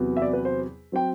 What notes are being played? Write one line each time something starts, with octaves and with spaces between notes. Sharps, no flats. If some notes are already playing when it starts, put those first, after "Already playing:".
Already playing: E2 C3 F#3 B3
E5
D5
B4
C5
F#3 C4 G5